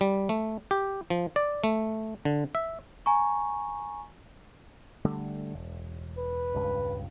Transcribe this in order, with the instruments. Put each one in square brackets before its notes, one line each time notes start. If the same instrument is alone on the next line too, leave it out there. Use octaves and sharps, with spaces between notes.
[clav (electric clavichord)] G3
A3
G4
F3
D5
A3
D3
E5
[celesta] G#5 A#5 C#6
[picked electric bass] D3 G3 A3
E1
[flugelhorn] B4
[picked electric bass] E1 C#2 G2